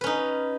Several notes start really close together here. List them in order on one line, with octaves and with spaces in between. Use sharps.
B4 C#4 D#4